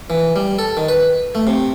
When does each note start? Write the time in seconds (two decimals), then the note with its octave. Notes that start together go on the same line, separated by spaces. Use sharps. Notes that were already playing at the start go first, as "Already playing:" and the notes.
0.10 E3
0.36 G3
0.59 A4
0.77 D#3
0.88 B4
1.35 A3
1.47 C3